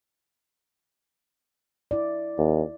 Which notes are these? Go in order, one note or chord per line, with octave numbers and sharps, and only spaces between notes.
E4 D5
D#2